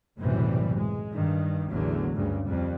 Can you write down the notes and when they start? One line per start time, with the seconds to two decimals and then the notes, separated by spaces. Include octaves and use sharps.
0.19 B1 F#2 A2 C3 E3 G3
0.75 G#3
1.11 G2 D#3
1.70 A1 E2 D3 F#3 A3
2.15 D2 G2 C#3
2.45 F2 G3